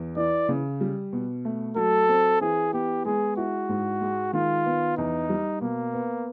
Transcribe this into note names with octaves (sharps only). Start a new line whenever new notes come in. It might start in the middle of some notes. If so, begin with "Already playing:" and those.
Already playing: E2
E3 D5
C#3
G3
B2
A3
F#3 A4
C4
E3 G#4
B3 G4
G#3 G#4
E4 F#4
G#2
G#3
D#3 F4
B3
E2 D#4
G3
B2 A#3
B3